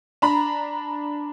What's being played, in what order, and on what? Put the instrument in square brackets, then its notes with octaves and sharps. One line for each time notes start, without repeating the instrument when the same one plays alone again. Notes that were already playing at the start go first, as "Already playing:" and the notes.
[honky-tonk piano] D4 A#5 B5